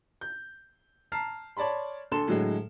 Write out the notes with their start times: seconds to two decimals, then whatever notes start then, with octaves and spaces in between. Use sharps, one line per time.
0.21 G6
1.12 A5 A#5 F6 C7
1.57 C#5 D5 A5 B5 C6
2.12 D2 A4 C6 E7
2.28 A2 D3 F#3 G#3